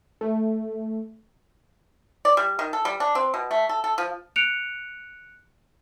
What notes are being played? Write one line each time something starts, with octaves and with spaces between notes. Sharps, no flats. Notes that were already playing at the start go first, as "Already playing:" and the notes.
A3
D5
G3
D#3
A4
G3
D4
C4
B2
A3
A4
A4
F3
F#6 C#7 D7 F7